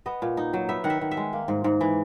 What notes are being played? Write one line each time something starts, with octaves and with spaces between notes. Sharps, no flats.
B3 D#5
A#2
D#4
F#3
B3 E5
D#3 F#5
E5
D#3
E5
G#3
A#3
G#2
G#2
E3